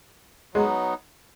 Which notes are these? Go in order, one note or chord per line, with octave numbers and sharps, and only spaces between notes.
F#3 G#3 B3 D#4